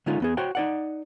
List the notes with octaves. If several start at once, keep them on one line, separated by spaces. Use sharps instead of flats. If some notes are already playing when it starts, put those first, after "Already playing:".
D3 G#3 A3 C#4 D#4 F4
E2 B3 G#4
F#4 C5 C#5 G5
D#4 D5 F#5